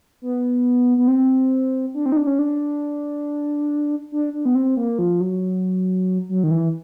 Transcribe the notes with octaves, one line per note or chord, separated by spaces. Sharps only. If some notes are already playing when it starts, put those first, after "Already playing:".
B3
B3
C4
D4
C4
D#4
D4
C#4
D4
D4
D4
B3
C4
A#3
F3
F#3
F#3
D#3
E3